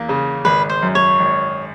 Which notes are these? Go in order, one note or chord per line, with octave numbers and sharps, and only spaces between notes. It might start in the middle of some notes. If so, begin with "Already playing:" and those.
Already playing: E2 A#3
C#3
G#1 B4
C5
F#2
C#5
G#1